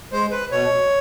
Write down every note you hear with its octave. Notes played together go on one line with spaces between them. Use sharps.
G#3 C5
B4
B2 C#5